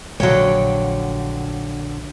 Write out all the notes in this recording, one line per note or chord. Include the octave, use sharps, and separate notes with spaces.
A#1 D3 F3 F#3 C#5 G5